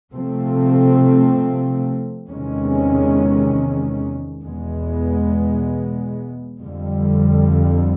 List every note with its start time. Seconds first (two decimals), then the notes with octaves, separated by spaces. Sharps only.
0.13 C3 F3 A3 C4
2.30 E2 C3 D#3 G#3 C#4
4.46 E2 B2 G#3 B3
6.63 F2 D3 G3